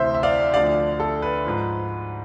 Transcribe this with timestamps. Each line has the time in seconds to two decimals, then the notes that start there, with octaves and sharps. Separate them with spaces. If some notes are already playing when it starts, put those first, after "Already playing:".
Already playing: D2 C3 E3 C5 E5
0.14 E5
0.23 D5 F5
0.54 D2 D3 F3 D5 F5
1.00 A4
1.22 B4
1.45 G#2 F3